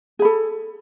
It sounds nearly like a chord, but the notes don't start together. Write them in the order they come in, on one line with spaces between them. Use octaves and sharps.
G#4 B5 A4